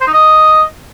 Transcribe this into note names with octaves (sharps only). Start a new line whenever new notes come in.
C5
D#4
D#5